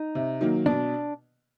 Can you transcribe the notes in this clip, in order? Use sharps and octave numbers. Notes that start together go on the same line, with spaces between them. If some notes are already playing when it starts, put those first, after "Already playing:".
Already playing: D#4
C3
D#3 F#3 A#3
B2 D4